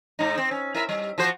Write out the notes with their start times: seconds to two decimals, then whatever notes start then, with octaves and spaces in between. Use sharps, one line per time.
0.19 G#2 D#4
0.38 C4
0.51 C#4
0.75 E4 A#4 E5
0.89 G3
1.18 F3 F#4 C5